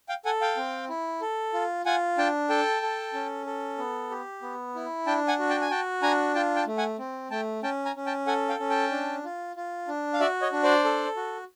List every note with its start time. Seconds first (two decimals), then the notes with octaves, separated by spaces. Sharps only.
0.09 F5 G5
0.25 A4 F#5 G#5
0.41 F5 G5
0.57 C4
0.89 E4
1.21 A4
1.53 F4
1.86 F4 F#5 G#5
2.18 D4 G5 A5
2.49 A4 G5 A5
2.82 A4
3.14 C#4
3.46 A4
3.78 B3
4.11 G4
4.42 B3
4.75 E4
5.06 D4 G5 A5
5.28 F#5 G#5
5.39 F#4
5.50 G5 A5
5.61 G#5
5.70 F#4 G5 A5
6.02 D4 G#5 A#5
6.35 F4 G5 A5
6.56 G5 A5
6.67 A3
6.78 F#5 G#5
6.99 C4
7.31 A3 G5 A5
7.63 C#4 G5 A5
7.85 G#5 A#5
7.96 C#4
8.06 G5 A5
8.27 A4 F#5 G#5
8.49 F5 G5
8.60 C#4
8.70 G5 A5
8.91 D4
9.24 F4
9.56 F4
9.88 D4
10.14 F5
10.20 F#4 D5 E5
10.42 C#5 D#5
10.52 D4
10.63 C5 D5
10.84 A4
11.16 F#4